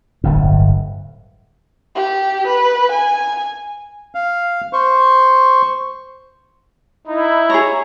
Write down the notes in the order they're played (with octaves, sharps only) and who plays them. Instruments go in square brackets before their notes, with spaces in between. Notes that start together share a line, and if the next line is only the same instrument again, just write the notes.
[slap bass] D1 G1 G2
[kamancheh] G4
B4
G#5
[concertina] F5
C5 C#6
[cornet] D#4 [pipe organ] E4
[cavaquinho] G#4 A#5 [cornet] C#5